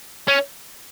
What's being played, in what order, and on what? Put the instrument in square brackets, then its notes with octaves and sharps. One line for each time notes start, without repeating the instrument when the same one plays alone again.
[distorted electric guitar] C#4